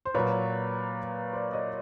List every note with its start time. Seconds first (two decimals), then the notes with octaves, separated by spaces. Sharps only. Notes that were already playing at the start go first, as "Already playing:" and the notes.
0.05 C5
0.14 A#2 F#3 B4 C#5
1.33 C5 D5
1.53 C#5 D#5